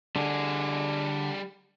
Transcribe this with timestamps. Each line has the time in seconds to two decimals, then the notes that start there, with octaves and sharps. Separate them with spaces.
0.16 D3 G3 G#4